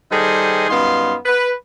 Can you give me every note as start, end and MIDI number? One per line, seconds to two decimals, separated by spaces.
0.12 0.68 51
0.12 0.68 55
0.12 0.68 68
0.12 0.68 69
0.12 0.68 72
0.12 0.68 75
0.69 1.16 42
0.69 1.16 55
0.69 1.16 59
0.69 1.16 63
0.69 1.16 77
0.69 1.16 84
1.26 1.52 71